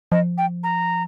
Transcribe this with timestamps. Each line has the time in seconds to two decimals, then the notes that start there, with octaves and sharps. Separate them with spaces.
0.12 F3 D#5
0.38 G5
0.64 A#5